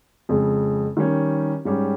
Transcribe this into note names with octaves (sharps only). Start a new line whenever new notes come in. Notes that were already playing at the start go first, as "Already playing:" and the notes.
F2 C#3 G#3
D#3 G3 C#4
G#2 G3 C#4 G4